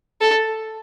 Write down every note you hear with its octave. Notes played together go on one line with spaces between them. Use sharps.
A4